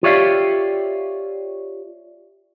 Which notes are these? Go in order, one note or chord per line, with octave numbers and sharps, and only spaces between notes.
F4 G4 C#5 D5 E5 F5